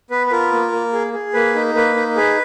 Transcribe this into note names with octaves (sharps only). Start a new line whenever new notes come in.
B3 B4
B4
F4 A#4
A#3
A#3
G#4
G#4
A#3 B4
D#4
A#3 B4
D#4
G#4 B4